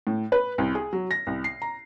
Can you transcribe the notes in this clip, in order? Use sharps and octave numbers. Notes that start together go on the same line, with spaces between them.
A2
B4
C2
G#4
F#3
A#6
C2
C7
A#5